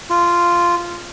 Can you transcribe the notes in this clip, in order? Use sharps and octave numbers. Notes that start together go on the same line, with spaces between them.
F4